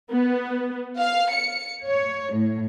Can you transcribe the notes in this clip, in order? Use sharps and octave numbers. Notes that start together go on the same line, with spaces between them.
B3
F5
C#7
C#5
A2